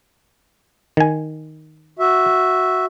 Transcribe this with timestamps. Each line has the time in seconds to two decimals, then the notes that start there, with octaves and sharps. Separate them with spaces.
0.97 D#3 G#5
1.99 F#4 E5